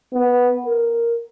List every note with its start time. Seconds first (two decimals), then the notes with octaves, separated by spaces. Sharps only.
0.14 B3
0.66 A#4